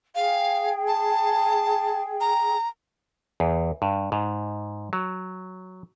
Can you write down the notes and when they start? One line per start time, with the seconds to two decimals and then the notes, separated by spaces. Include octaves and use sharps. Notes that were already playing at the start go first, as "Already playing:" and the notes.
0.15 G#4 F5 G5
0.87 A5
2.21 A#5
3.40 E2
3.82 G2
4.12 G#2
4.93 F#3